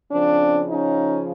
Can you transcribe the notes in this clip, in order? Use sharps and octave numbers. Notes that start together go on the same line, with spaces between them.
C#3 F3 C4 D4
C#4 D#4